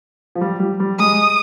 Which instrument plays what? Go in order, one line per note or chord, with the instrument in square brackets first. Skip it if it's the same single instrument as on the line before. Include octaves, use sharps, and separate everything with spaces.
[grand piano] F3
G3
G3
G3
[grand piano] G#3 [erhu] D#6